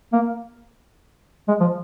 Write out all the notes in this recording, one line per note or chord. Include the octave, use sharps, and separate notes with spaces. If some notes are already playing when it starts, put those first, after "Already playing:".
A#3
G#3
F3